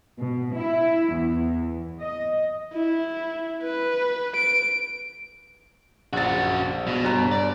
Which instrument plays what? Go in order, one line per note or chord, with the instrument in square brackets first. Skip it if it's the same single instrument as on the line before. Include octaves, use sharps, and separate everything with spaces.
[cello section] B2
E4
E2
D#5
[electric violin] E4
B4
D7
[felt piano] A#1 A6 [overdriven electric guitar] C#3 F#4
[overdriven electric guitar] B2
[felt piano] G1 A#5
[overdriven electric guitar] D5